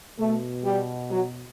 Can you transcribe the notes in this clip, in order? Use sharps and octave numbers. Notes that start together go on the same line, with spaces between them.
B2 A3
G3
F#3